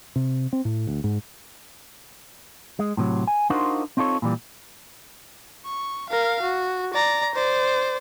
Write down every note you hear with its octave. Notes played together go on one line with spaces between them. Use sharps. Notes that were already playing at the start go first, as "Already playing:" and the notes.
C3
C4
A2
D2
G#2
G#3
A2 C3 F3 F#3
G#5
D4 D#4 F4 F#4 A#4 C5
C4 D#4 F4 A4 C#5
A#2 E3 G3
C#6
A#4 F5
F#4
D5 A#5
C5 D5